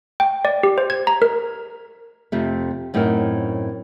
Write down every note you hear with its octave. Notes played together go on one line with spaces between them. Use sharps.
G5
D5
G4
C5
G#6
A#5
A#4
F2 C3 A3
F#2 A2 C4 D#4 G4 A#4